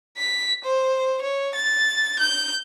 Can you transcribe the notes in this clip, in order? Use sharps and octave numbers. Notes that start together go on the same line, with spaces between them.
B6
C5
C#5
A6
G6